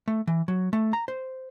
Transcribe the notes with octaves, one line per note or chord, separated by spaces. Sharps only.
A3
E3
F#3
A3
A#5
C5